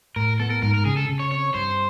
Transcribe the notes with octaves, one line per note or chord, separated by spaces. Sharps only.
A2 A#4
B3 A4
A#4
G#2 A#4
A#4
C#3 G#4
A4
C#3
C#5
C4 C#5
G2 C5